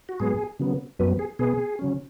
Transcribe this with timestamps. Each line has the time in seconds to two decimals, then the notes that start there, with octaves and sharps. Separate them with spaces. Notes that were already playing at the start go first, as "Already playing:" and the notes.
0.09 F#4
0.20 G#2 F#3 B3 G#4
0.59 C#3 F#3 B3
0.99 F#2 F#3 B3 B4
1.19 G#4
1.39 B2 B3 G#4
1.79 C#3 F#3 C#4